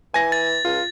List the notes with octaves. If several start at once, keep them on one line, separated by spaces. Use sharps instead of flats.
E3 G#5 A#6
A6
C#2 F4